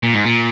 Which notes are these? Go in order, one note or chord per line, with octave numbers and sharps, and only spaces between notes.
A#2
G#2
A#2